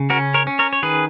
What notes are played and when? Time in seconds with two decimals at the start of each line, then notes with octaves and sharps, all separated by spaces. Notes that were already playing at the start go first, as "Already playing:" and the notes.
Already playing: C#3
0.10 C#4 F#4 A#4
0.34 A#4 C#5
0.47 C#4
0.59 A#4 C#5
0.73 C#5
0.83 D#3 G#4 B4